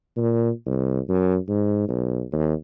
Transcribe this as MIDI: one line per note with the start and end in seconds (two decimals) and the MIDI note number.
0.16 0.50 46
0.66 0.99 36
1.09 1.37 42
1.49 1.86 44
1.88 2.22 35
2.32 2.53 39